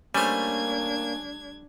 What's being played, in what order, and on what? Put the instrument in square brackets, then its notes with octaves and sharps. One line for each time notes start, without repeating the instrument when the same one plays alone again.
[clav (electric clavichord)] G3 A3 [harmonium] A#3 [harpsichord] C#4 C5 [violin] D4 G#6